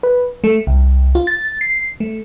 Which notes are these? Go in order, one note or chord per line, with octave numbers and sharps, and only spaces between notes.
B4
A3
C2
F4
A6
C7
A3